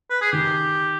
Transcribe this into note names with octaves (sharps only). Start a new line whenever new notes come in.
B4
G#4
D#3 G4